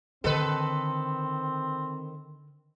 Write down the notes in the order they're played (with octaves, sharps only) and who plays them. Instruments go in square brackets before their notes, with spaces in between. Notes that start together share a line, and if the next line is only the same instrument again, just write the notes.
[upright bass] D3 [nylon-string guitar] D#3 A5 [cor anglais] C4 [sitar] A4 B4